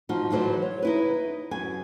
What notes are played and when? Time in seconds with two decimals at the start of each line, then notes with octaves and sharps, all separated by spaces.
0.09 F3 D#4 F#4
0.31 D2 E3 F#3 C5 D5
0.62 C#5
0.82 D#4 E4 B4
1.51 F#2 G#5